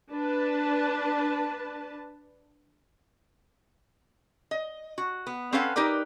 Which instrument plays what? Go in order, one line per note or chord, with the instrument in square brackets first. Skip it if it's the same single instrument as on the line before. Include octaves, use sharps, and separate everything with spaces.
[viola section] D4 B4 A5
[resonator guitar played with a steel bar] D#5
F#4
B3
C4 C#4 A4 B4 F5 F#5
D#4 G4 A#4 B4 D5